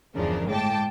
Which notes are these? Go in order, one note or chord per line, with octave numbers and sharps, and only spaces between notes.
G1 E2 C#3 F3 D4 A#4
A2 G#3 G5 A5 D6